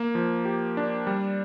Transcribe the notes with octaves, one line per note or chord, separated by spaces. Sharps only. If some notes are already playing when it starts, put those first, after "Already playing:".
Already playing: A#3
F3
G4
D4
G3